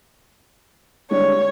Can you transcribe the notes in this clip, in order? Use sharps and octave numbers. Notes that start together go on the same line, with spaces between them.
D3 G3 G#3 C#5